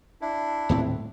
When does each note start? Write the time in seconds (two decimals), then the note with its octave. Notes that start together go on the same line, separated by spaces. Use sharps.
0.21 D4 E4
0.69 D#1 A2 C4